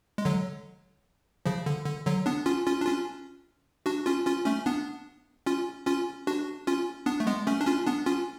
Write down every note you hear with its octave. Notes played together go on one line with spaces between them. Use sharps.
G#3
D3 F#3
C#3 F3
D3
D3
D3 F#3
B3 D4
C#4 F4
C#4 F4
D4
C#4 F4
D4 F#4
C#4 F4
C#4 F4
A3 C#4
B3 D4
C#4 F4
C#4 F4
D4 F#4
C#4 F4
B3 D4
A3
G#3 B3
A3 C#4
D4
C#4 F4
B3 D4
C#4 F4